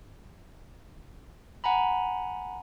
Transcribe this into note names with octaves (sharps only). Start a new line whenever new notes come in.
F#5 G#5 A#5 B5